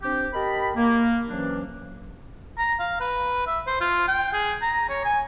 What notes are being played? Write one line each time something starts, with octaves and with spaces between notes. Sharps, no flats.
C4 D4 G4
G4 A#4 D#5 A5 B5
A#3
C3 E3 F#3 C#4 D4
A#5
F5
B4
E5
C5
F4
G5
G#4
A#5
C#5
G#5